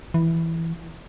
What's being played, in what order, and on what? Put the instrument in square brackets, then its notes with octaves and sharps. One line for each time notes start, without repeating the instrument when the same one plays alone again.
[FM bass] E3